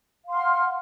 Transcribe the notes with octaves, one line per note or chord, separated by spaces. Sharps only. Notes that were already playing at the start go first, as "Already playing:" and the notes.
F5 F#5 C6 F6